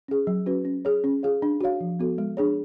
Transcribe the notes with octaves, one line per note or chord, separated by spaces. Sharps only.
C#4 G#4
F#3
C#4 F#4 B4
C#4
G#4 C#5
C#4
F4 G#4 C#5 F5
D4
F#4 C#5 F5
F3
B3 F#4 A4
G#3
D4 G#4 C#5